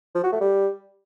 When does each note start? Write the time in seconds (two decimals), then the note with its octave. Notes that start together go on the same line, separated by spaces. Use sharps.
0.15 F3
0.23 F#4
0.32 A3
0.41 G3